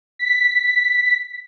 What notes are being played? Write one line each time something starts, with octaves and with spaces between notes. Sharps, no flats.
B6